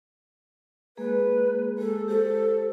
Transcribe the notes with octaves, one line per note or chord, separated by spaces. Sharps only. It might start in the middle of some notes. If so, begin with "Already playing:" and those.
G#3 A#3 G#4 B4
G#3 G#4 A4
G4 A4 C5